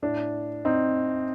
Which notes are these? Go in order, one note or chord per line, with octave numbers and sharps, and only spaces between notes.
A2 D4
C4 D#4